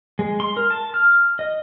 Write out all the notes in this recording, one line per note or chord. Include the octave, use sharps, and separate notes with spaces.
G#3
C6
A#4
A5
F6
D#5